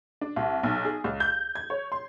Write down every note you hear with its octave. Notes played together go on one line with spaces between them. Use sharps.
D4
C2
B1
G#4
C#2
G6
G#6
C#5
C6